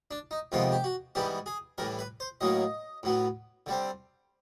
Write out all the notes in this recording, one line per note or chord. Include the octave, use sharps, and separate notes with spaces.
D4
D#4
F2 C3 D#3 G#3 B3 F4
G4
F#4
G#2 E3 G3 B3 G4
G#4
A2 E3 G3 A#4
B4
C5
A2 F#3 A#3 C#4 D#5
A2 F#3 B3
D3 G3 C4